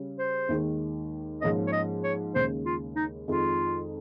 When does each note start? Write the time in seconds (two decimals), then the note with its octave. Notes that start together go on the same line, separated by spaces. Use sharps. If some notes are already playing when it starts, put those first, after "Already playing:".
Already playing: C#3 G3 C#4
0.19 C5
0.49 D#2 D#3 G#3
1.41 G#2 F3 A#3 C#4 D#5
1.67 C#5
1.72 D#5
2.04 C#5
2.35 D#2 C#3 G#3 C5
2.66 F4
2.96 D#4
3.28 F2 D#3 G#3 D#4 F4